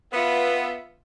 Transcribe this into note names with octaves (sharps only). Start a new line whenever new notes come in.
B3 F4 E5